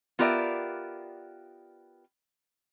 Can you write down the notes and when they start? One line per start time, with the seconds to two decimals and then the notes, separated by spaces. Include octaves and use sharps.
0.19 B3 F4 G4 A#4 D5 E5